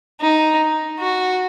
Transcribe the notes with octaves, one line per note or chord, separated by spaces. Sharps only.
D#4
F#4